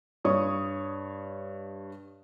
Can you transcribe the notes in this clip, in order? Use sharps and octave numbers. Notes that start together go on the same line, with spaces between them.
G2 C#5 C#6 D#6